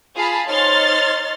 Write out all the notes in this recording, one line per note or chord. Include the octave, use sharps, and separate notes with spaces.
F4 G#4 F5 A5 B5
D#4 C5 C#5 C6 F6 A6